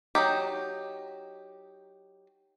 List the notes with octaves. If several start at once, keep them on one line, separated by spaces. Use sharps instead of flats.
F#3 D#4 G4